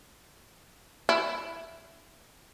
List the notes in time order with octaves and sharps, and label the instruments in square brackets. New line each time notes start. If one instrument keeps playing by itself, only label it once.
[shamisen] E4